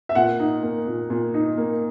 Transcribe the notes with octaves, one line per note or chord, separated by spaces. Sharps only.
E5
A#2 F#5
D#4
A#3
A#2
A#2
D#4
A#3